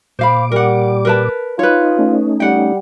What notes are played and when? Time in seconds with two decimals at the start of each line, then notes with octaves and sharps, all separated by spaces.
0.19 A#2 C5 F5 B5 D6
0.52 G3 A#4 F#5
1.05 A#4 B4 A5
1.59 D#4 F4 B4 C#5
1.99 A3 C#4 D#4
2.40 G3 F#5 G5